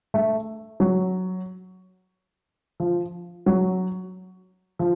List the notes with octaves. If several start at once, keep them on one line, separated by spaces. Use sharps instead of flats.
A3
F#3
F3
F#3
F3